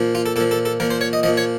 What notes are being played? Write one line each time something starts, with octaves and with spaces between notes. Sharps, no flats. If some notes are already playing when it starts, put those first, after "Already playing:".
Already playing: A#2 F3
F4
A4
A#2 F3 A4
A4
A4
A#2 F3 A#4
C5
C#5
D#5
A#2 F3 D#5
C#5